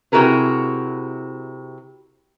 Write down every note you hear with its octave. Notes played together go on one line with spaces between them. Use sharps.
C3 E4 F#4 G#4 A#4 B4